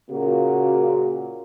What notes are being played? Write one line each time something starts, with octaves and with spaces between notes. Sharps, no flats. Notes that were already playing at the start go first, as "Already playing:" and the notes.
A#2 C#3 A#3 F#4